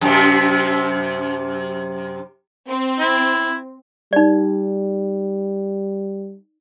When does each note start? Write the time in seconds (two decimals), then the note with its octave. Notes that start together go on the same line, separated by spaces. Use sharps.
0.01 F#2 C3
2.67 C4
2.99 E4
4.13 G3 D#4 D5